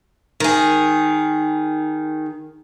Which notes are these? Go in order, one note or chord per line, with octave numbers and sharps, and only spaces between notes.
D#3 G#4